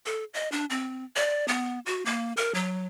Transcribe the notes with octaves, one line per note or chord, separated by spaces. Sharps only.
A4
D#5
D4
C4
D5
B3
F#4
A#3
A#4
F#3